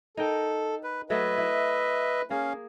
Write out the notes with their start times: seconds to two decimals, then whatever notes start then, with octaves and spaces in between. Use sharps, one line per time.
0.17 D#4 A4 A#4 G5
0.83 B4
1.10 F#3 A3 A4 B4 D#5 E5
1.38 E4
2.30 A#3 C#4 G#4 F5